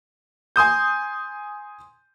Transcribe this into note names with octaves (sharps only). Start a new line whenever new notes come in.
G#5 C6 D#6 G6